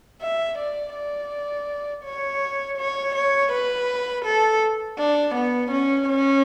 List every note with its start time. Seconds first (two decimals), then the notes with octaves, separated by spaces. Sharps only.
0.21 E5
0.58 D5
0.95 D5
2.04 C#5
2.78 C#5
3.15 C#5
3.52 B4
4.25 A4
4.98 D4
5.35 B3
5.71 C#4
6.08 C#4